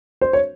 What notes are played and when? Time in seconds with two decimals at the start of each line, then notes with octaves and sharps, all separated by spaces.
0.21 C5
0.33 C#5